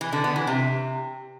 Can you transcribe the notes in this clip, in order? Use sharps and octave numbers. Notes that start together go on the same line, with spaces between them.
E3
D3
B3
E3
C3